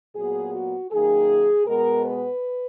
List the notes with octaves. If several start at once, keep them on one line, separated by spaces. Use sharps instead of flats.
A#2 F#3 B3 G#4
F#4
F#2 D#3 A#3 G#4
B2 G#3 B3 A#4
B4